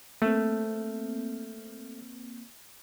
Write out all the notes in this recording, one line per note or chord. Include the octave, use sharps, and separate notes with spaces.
A3 A#3 C4